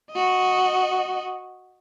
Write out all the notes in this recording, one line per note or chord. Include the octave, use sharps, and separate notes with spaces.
F#4 D#5